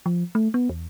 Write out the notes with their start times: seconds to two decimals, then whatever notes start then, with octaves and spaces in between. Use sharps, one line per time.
0.06 F3
0.35 A3
0.54 B3
0.69 E2